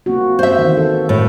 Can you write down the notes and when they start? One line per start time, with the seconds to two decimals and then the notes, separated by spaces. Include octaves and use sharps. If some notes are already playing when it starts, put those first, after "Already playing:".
0.06 A#3 C4 F#4
0.39 C5 E5
0.58 D#3 E3
0.77 A4
1.09 A2